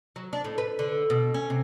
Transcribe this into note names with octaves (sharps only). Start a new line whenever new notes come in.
F#3
D4
A2
B4
D3
B2
C#4
C3